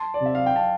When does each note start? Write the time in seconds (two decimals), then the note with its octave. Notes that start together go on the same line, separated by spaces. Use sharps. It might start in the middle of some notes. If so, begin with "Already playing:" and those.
Already playing: A5 C6
0.14 D5
0.21 C3 E5
0.35 F5
0.46 G5
0.56 F5 A5